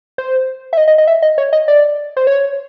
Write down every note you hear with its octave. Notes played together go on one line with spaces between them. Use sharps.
C5
E5
D#5
D#5
D#5
E5
D#5
C#5
D#5
D5
C5
C#5